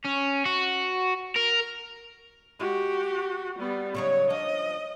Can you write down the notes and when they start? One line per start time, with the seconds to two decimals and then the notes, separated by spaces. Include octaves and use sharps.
0.05 C#4
0.46 F#4
1.36 A#4
2.60 G#3 F#4 G4
3.59 G3 B3
3.95 C#3 F#3 D#4 C#5
4.30 F3 D4 D#5